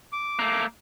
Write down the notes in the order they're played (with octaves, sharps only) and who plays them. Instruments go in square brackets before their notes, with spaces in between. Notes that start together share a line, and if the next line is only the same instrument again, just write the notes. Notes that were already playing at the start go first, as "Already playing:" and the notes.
[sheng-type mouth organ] D6
[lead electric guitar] A3 A#3